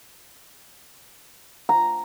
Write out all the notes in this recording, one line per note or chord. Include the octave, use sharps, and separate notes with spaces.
A#5